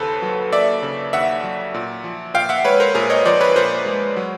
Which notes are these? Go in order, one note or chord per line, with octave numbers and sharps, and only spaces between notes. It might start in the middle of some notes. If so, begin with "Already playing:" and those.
Already playing: D#2 C#3 A#3 A4 B4 C5
F#3
A#3 D5 E5
C#3
D#2 E5 F#5
F#3
A#2
F3
A#2 F5 G5
E5 F#5
G#3 B4 C#5
A#4 C5
A#2 G#4 A#4
C#5 D#5
F3 C5 D5
B4 C#5
A#2 A#4 C5
G#3
F#3